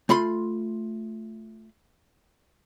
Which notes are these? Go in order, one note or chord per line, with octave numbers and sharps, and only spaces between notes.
A3 F4 B5 C6